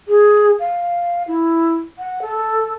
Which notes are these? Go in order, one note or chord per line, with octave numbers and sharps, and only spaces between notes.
G#4
F5
E4
F#5
A4